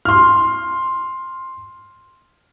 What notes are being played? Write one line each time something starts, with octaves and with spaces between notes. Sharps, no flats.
C6 F6